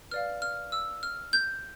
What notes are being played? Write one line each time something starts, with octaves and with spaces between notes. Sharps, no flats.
B4 D5 F5 F6
F6
E6
F6
G6